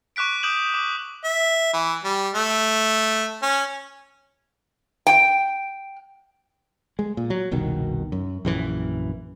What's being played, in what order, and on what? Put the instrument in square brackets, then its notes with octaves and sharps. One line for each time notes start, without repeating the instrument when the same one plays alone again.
[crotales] C#6 D6 F#6 B6 D7
D6 D#6 G6 D7 E7 F#7
D6
[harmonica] E5
E3
G3
A3
C#4
[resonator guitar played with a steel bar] G5
[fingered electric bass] G#3
A#2
F#3
F#1 C2 B2 D#3
F#2
A#1 F#2 E3